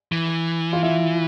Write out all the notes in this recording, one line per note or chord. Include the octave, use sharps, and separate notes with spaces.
E3
F4
E4